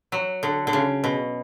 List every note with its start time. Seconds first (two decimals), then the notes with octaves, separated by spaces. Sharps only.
0.12 F#3
0.43 D3
0.67 D3
0.73 C#3
1.04 B2